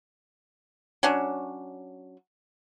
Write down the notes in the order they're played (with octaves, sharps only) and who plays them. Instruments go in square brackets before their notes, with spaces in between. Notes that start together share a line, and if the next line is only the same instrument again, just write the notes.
[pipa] F#3 C#4 D4